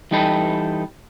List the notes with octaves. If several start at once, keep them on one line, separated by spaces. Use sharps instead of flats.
E3 G3 D#4 G4 A4 B4